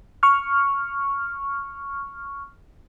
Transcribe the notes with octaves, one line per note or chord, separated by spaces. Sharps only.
C#6 F6